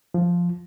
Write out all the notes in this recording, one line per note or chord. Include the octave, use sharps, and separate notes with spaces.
F3